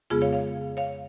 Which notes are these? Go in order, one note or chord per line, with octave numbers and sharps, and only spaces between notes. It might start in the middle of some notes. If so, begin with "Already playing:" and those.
F2 C#3 G#3 B3 F4 G#4
C#5 F5
C#5 F5
C#5 F5